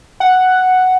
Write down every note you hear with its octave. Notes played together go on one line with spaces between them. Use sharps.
F#5